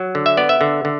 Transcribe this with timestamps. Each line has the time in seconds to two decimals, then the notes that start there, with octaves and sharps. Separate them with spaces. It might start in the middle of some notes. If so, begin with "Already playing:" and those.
Already playing: F#3
0.15 D3
0.26 E5
0.37 B3 D5
0.49 E5
0.61 D3
0.85 D3